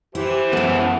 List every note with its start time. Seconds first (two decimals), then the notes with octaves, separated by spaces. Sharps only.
0.15 E3 E4 G4 C5
0.53 F#2 G#3 A3 B3 E4